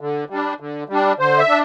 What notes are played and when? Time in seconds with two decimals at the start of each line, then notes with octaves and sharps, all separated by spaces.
0.01 D3
0.30 G3 D4
0.60 D3
0.89 G3 D4
1.19 D3 C5
1.38 E5
1.49 D4